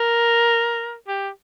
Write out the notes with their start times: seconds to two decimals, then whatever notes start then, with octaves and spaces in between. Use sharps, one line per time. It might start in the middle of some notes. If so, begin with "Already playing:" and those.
Already playing: A#4
1.08 G4